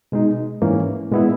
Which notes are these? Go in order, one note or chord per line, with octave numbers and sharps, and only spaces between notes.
B2 G#3 D#4
G#2 E3 A#3 C#4
A#2 G#3 B3 E4